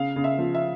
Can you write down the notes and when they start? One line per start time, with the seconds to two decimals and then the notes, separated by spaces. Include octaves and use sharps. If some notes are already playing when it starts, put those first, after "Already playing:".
Already playing: C#3 F5
0.16 C#3
0.24 E5
0.39 F3
0.55 E5